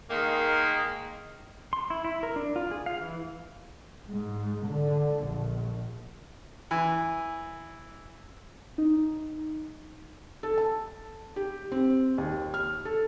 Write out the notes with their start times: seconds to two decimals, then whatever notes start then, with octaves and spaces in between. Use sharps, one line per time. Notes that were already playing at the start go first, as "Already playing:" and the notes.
0.11 D#3 G#3 A#3
1.73 C6
1.90 E4
2.05 E4
2.23 A#4
2.36 D4
2.56 F4
2.71 G#4
2.86 F5
3.01 E3
4.09 G#2
4.67 D3
5.23 A#1
6.71 E3
8.78 D#4
10.43 A4
10.58 A5
11.36 G4
11.72 C4
12.18 D#2
12.54 F6
12.85 A4